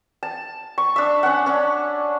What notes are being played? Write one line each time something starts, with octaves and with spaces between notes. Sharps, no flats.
A5
C#6
D4 E5
C#4 F#5
C#4 D4